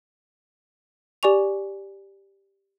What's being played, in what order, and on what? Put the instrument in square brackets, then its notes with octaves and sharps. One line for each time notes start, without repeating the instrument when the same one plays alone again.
[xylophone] G4 D5 G#5 C#6 F7